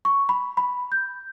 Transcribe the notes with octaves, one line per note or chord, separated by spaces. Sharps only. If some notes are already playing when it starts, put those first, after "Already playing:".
C#6
B5
B5
G6